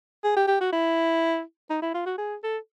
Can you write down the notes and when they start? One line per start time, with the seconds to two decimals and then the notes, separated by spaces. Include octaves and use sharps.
0.24 G#4
0.36 G4
0.48 G4
0.60 F#4
0.72 E4
1.70 D#4
1.82 E4
1.94 F4
2.06 F#4
2.18 G#4
2.43 A4